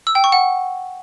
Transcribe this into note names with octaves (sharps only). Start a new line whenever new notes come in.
E6
G5
C#6
F#5